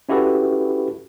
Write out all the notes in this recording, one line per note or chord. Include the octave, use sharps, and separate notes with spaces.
C#4 E4 F#4 G4 A4 B4